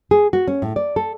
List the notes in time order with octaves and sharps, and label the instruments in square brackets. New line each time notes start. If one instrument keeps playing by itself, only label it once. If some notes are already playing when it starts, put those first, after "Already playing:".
[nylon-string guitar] G#4
F#4
C#4
A2
D5
A4